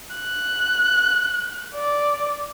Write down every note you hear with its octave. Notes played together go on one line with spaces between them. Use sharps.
F#6
D5